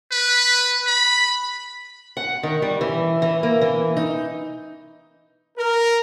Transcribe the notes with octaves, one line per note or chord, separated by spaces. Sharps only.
B4
B5
F#5
D#3
G3
E3
E3
A#3
E3
D#4
A#4